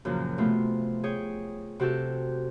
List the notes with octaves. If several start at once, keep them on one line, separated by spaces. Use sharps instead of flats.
F#2 A#2 C#3 F3
C3 A3 B3 F4
G#4 C#5 G5
C3 F#4 G4 A4